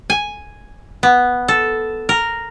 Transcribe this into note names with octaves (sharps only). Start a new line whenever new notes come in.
G#5
B3
A4
A#4